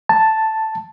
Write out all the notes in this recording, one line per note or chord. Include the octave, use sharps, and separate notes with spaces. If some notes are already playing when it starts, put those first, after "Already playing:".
A5